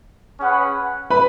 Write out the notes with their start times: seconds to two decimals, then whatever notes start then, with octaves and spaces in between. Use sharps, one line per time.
0.40 C#4 G#4 B4 F#5
1.10 B4 B5